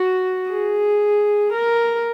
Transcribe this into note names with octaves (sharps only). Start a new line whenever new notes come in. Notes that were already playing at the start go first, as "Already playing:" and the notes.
Already playing: F#4
G#4
A#4